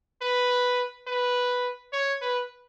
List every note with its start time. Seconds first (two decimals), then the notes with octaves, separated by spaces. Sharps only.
0.22 B4
1.07 B4
1.93 C#5
2.21 B4